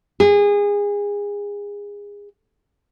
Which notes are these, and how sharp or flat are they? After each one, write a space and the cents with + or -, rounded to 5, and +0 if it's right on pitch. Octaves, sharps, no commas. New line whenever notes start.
G#4 -25